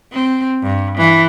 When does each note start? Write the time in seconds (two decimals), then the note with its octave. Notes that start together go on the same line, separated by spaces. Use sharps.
0.13 C4
0.62 G2
0.97 E3